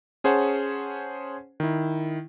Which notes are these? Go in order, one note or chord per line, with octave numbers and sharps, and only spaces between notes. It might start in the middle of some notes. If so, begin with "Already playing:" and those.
C#4 G#4 C5 C#5 F#5 A5
D#3 E4